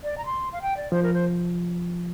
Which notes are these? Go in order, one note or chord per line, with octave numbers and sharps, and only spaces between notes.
D5
A#5
C6
F5
G5
D5
F3 C5
A#4
C5